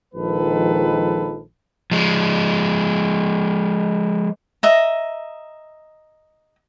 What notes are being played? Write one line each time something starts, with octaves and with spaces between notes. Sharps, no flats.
A#1 D#3 F3 G#3 A4 B4
F3 G#3
D#5 E5 A#5